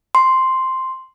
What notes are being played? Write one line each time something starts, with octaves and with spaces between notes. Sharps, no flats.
C6